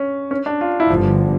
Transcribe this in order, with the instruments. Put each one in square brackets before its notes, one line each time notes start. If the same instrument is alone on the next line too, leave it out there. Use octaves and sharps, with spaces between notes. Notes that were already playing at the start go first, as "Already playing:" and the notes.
Already playing: [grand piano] C#4
C#4
D4
F4
E4
[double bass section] G1 G2 D3 [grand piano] F3